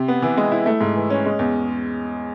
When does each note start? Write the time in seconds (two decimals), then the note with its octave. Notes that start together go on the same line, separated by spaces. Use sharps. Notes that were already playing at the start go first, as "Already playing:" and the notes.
Already playing: C3
0.08 B3
0.22 E3
0.37 G#3
0.52 E4
0.66 A3
0.81 G#2
0.95 E3
1.10 C#4
1.26 G#3
1.39 E2